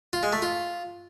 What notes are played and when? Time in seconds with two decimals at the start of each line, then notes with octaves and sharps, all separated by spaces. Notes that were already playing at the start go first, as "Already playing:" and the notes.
0.13 F4
0.23 G#3
0.33 A3
0.42 F4